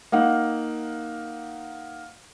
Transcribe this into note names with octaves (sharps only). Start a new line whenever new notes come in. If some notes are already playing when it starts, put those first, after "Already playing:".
A#3 D#4 F5 F#5